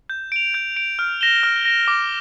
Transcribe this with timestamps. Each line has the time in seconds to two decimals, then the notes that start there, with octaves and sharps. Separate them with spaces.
0.10 G6
0.32 D7 F7
0.54 G6
0.76 D7 F7
0.99 F6
1.21 A#6 E7 G7
1.43 F6
1.65 A#6 E7 G7
1.88 D6